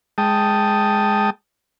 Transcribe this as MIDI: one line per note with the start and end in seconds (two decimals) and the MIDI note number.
0.18 1.30 56
0.18 1.30 79
0.18 1.30 81
0.18 1.30 87